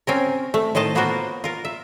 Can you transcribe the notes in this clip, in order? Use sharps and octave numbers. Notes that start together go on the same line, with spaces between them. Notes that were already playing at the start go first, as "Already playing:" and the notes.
C4 C#4 A#4
A3
A2 D#3 C5 D#5 A5
A#3 B3 F4 F#4 A#4 C5
F4 A#4
E5